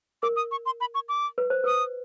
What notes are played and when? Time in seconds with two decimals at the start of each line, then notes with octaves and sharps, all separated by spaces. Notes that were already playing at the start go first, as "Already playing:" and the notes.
0.23 A#4 D6
0.36 D#6
0.51 C#6
0.66 C6
0.81 B5
0.95 C#6
1.09 D6
1.38 B4
1.50 C5
1.64 B4 D#6